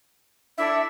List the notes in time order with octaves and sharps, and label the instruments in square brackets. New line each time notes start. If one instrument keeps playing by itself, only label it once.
[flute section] D4 E4 A4 [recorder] E5